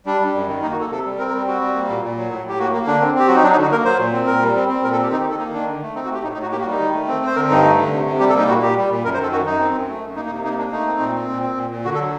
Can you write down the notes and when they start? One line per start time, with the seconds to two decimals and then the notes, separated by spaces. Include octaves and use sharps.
0.06 G3 D4
0.21 G3
0.35 F#2
0.48 D#3
0.62 A#3 D#4
0.72 F#4
0.77 A#3 A4
0.91 C3 A4
1.05 G3
1.18 C4 A#4
1.28 A#4
1.33 G3
1.46 C4 F#4
1.61 G3
1.75 A#3
1.89 A#2
2.02 A#2
2.17 F#3
2.31 A2
2.46 A2 G4
2.59 A#3 F#4
2.73 A#3
2.87 D3 D4
3.01 C4
3.15 C4 G4
3.28 F#3 F#4
3.35 D#4
3.43 F#3 D4
3.52 D#4
3.58 D3 F#4
3.71 A#3 A#4
3.85 F#3 C5
3.99 A#2
4.13 C4
4.27 A#2 A#4
4.42 G3
4.56 C4
4.69 C4
4.83 A#2 A#4
4.92 A4
4.98 C4 G4
5.11 D#3 D#4
5.20 G4
5.26 D#3 A4
5.39 A#3 D#4
5.53 D#3 D4
5.68 D3
5.82 A3
5.95 C4 D#4
6.05 F#4
6.10 A3 G4
6.23 A2 D#4
6.34 D#4
6.37 A2
6.42 F#4
6.52 A#3 G4
6.61 F#4
6.66 G3 D#4
6.80 D#3
6.93 A3
7.08 C4
7.22 C4 C5
7.36 D3 A#4
7.50 G2 D#4
7.64 A3
7.78 D3
7.92 C3
8.06 C3
8.20 G3 G4
8.29 A4
8.34 A#3 D#4
8.48 A#2 F#4
8.62 A#2 G4
8.77 G3
8.90 A#2
9.04 F#2 A#4
9.14 C5
9.19 D#3 A4
9.32 F#2 F#4
9.46 F#2 D#4
9.60 C4
9.75 F#2
9.88 A3
10.02 F#2
10.16 A#3 D#4
10.26 D#4
10.31 C3
10.44 A#3 D#4
10.58 A#3 D4
10.72 A3 D#4
10.87 C4
11.00 A#2
11.15 C4
11.29 A#2
11.43 C4
11.56 A#2
11.70 A#2
11.85 D3 F#4
11.95 A4
11.99 F#3